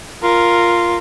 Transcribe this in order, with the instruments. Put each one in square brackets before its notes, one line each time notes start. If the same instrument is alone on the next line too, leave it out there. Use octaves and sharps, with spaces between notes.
[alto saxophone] F4 [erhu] A#4